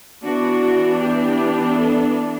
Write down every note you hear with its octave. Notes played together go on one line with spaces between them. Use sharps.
E3 B3 D4 F#4
G4
A4